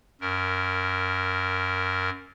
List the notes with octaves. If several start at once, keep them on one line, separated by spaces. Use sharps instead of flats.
F#2 A#4